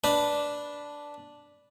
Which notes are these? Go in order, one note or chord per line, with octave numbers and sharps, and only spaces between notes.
D4 B4